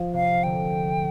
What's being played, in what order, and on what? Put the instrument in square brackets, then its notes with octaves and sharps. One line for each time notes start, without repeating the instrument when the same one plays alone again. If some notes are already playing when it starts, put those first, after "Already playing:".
Already playing: [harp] F3
[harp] C3 [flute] F5
[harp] D3 [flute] G5